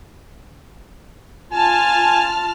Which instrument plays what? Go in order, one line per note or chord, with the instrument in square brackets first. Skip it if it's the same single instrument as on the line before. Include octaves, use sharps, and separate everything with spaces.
[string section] F4 A5 F6 [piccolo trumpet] G#5